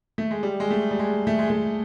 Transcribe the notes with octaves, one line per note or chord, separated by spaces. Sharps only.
A3
G#3
G3
G#3
A3
G3
G#3
A3
G#3
A3